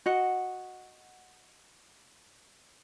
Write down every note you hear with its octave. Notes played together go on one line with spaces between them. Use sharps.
F#4 D#5 F#5